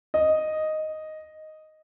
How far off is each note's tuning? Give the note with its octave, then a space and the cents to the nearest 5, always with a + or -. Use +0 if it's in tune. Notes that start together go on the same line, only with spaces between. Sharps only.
D#5 +0